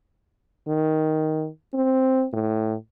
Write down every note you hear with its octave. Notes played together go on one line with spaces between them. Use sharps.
D#3
C4
A2